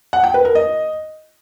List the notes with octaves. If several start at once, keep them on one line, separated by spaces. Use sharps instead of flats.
F#5
G5
B4
A#4
D#5